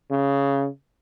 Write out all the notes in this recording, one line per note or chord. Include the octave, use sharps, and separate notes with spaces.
C#3